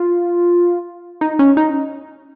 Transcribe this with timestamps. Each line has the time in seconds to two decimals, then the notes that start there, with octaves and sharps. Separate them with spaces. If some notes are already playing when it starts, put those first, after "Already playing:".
Already playing: F4
1.21 D#4
1.39 C#4
1.57 D#4